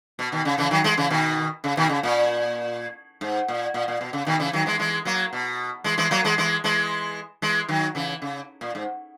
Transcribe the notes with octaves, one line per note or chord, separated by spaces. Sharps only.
B2
B2 D#3
C#3
C#3 E3
D#3 F#3
E3 G#3
C#3 E3
B2 D#3
C#3
B2 D#3
C#3
A#2
G#2
A#2
A#2
A#2
B2
C#3
B2 D#3
C#3 E3
D#3 F#3
E3 G#3
E3 G#3
F#3 A#3
B2
E3 G#3
E3 G#3
F#3 A#3
E3 G#3
E3 G#3
E3 G#3
E3 G#3
D#3 F#3
C#3 E3
C#3
A#2
G#2